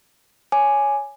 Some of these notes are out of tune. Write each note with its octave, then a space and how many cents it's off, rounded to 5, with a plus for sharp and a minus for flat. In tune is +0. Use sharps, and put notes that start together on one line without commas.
C#5 +10 G#5 +5 D6 +10